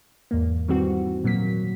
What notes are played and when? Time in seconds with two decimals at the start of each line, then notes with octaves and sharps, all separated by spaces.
0.31 E2 G#2 A#3
0.68 D#3 E3 G3 C4 F#4
1.24 A#2 F#3 A#3 B6